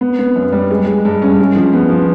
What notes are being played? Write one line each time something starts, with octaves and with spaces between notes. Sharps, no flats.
B3
B3
F#2
G3
G#3
G#3
G2
C#4
G#3
F3
B3
F3